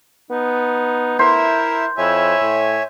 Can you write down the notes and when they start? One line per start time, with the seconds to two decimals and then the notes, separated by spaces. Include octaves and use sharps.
0.31 B3 D#4
1.19 E4 A#4 C5 E5
1.98 F2 E4 C#5 E5 G#5
2.41 A2